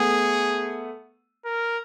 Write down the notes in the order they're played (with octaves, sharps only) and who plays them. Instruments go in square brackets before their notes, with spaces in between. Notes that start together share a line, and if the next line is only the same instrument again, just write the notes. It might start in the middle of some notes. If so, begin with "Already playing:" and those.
Already playing: [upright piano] A3 B3 [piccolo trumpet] G#4
[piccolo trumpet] A#4